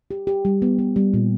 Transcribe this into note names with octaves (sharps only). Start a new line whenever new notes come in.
G4
G4
G3
B3
B3
G3
A#2